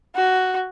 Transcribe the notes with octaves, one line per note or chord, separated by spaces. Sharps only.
F#4